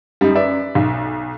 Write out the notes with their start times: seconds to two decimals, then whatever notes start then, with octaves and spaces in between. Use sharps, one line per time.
0.21 F#2 G3 D#4
0.35 B4 D5 E5
0.75 B1